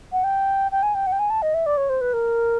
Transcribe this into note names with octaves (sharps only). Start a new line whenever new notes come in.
F#5
G5
G5
G#5
G5
F#5
G5
G#5
A5
D#5
E5
D5
C#5
C5
B4
A#4